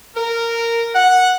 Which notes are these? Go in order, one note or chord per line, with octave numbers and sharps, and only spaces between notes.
A#4
F#5